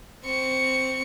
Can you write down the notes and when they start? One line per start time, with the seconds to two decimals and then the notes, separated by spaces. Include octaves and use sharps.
0.25 C4 C#6